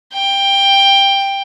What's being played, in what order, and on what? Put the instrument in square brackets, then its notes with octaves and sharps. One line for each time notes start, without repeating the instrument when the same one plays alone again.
[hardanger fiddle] G5